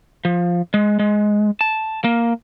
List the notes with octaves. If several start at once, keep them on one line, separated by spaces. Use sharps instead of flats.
F3
G#3
G#3
A5
A#3